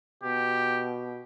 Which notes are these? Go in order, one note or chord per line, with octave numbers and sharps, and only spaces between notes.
B2 G4